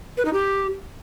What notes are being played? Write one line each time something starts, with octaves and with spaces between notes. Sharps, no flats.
B4
D#4
G4